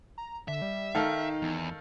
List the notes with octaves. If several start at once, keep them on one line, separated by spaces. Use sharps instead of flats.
A#5
D3 E5
G3
D#3 D#4 A4 F5
E2